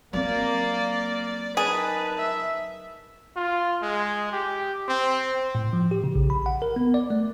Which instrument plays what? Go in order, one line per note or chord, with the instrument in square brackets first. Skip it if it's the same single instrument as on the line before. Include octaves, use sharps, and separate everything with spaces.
[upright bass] F#3 C4 [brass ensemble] A#3 [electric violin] D5
[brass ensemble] D#4 A#4 A5 [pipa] G#4 [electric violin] B4
[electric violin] E5
[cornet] F4
G#3
G4
C4
[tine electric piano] A2
F3
G4
C#3
A#1
B5
F#5
A#4
B3
D5
A3